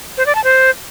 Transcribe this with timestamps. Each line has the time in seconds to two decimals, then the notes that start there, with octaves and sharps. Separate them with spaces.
0.17 C5
0.26 D5
0.35 A5
0.44 C5